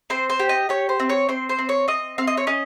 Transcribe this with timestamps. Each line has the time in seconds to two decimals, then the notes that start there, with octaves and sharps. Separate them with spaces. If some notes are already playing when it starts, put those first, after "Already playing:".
0.10 C4 C5
0.30 C5
0.39 G4
0.49 D#5
0.69 G4 C#5
0.89 C5
1.00 C4
1.09 C#5
1.29 C4 C5
1.49 C5
1.59 C4
1.69 C#5
1.88 C4 D#5
2.18 C4 F5
2.27 D#5
2.37 C#5
2.47 C#4 D#5